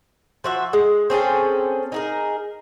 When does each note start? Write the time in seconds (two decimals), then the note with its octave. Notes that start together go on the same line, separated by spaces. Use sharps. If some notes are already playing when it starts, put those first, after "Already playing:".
0.44 F3 F#4 E5
0.73 G#3
1.10 C4 C#4 G#4 A4
1.92 D#4 G#4 A#4